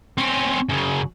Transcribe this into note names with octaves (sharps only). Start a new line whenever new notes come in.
C4 C#4
F#2 C#3